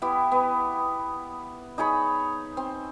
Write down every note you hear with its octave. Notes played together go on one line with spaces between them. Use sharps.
B3 E4 G4
B3
D#4 G#4 C#5 B5
C4